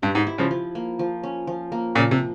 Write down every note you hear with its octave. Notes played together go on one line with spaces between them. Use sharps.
G2 G4
G#2
E4
C#3 F3
F3
A#3
F3
C#4
F3
A#3
A#2 C#3 F3
C3